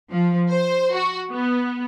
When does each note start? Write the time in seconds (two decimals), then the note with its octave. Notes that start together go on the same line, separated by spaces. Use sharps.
0.11 F3
0.50 C5
0.94 F#4
1.31 B3